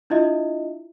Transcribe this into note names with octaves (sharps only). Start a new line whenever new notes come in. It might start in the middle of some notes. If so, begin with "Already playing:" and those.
D4 E4 F4 D#5 E5